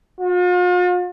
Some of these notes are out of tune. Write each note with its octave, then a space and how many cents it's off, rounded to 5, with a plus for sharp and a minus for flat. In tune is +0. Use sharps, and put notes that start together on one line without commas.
F4 +45